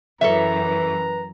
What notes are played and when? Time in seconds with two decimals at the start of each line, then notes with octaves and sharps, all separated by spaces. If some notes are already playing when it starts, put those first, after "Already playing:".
0.21 F#2 E3 A4 B4 C#5 E5 A#5